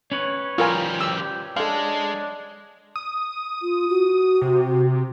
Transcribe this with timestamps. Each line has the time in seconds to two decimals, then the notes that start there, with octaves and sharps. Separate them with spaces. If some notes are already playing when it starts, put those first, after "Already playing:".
0.12 C#4 B4 C#5
0.58 F3 G3 F4 A#4 G#5
1.01 G4 E6
1.56 G#3 D4 A4 F5
2.96 D#6
3.62 F4
3.89 F#4
4.42 C3